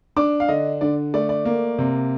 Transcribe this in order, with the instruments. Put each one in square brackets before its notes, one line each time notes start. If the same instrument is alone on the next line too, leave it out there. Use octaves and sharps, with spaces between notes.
[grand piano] D4 D6
F5
D3 D#5
D3 D5
A3 D5
D5
A#3
C3